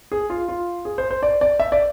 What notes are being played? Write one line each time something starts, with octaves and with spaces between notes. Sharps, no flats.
G#4
F4
F4
G#4
C5
C5
D5
D5
E5
D5